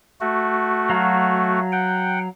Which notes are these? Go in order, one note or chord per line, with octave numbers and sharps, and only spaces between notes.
A3 F#4
F#3 F5
F#5 G5